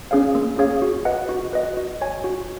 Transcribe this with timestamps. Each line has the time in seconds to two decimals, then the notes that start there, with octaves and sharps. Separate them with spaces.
0.11 C#4 G#4 C#5 F5
0.35 A#3
0.58 C#4 G#4 C#5 F5
0.82 F#4
1.05 B4 D#5 F#5
1.29 F#4
1.53 B4 D#5 F#5
1.77 F#4
2.01 C#5 G#5
2.24 F#4